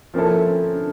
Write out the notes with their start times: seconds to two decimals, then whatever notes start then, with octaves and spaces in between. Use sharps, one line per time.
0.14 F3 A#3 C4 C#4 E4 A4
0.45 C4
0.75 D4